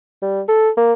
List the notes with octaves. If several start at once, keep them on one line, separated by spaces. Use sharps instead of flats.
G3
A4
A#3